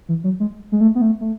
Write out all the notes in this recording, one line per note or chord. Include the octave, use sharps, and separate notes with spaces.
E3
F#3
G#3
G#3
A3
B3
A3
A3